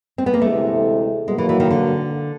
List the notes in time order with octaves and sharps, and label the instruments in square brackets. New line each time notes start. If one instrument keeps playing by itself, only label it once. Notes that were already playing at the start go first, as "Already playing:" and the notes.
[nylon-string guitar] C4
B3
A#3
[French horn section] D2 C3 E3 G#3 [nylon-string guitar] A3
[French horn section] B2 F#3 A#3 [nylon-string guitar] G#3
[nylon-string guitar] E3
E3
D#3
D3